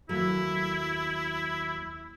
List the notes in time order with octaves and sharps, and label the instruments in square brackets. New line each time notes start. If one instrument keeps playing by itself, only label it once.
[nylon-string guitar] D#2 F#3 A3 [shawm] E4